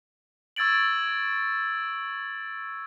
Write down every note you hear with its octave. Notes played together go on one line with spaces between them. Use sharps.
C#6 E6 G#6 A6 D7 F#7